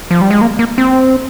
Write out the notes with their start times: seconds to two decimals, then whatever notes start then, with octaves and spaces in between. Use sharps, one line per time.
0.11 F3
0.21 G3
0.31 G#3
0.41 A#3
0.59 A#3
0.78 C4